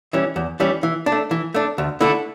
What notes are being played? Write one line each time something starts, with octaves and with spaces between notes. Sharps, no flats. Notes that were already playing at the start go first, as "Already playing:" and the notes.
E3 G3 C#4
E2
E3 G3 C#4
E3
D4
A3
E3
A3 D4
D2
D3 A3 E4